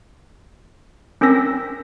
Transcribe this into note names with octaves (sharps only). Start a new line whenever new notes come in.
C4 C#4 A#4 E6 A#6 B6